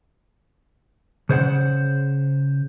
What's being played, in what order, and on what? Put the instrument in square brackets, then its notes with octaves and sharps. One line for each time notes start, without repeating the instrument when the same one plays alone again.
[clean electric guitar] C#3 C5 C#5 F#5